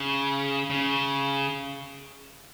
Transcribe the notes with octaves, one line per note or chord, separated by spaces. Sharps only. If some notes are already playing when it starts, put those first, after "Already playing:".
Already playing: C#3
C#3